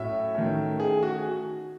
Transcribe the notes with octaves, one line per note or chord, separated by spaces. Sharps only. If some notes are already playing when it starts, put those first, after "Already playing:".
Already playing: A2 F#3 A3 C#4 E5
D#3 A3 C#4
G#4
F#4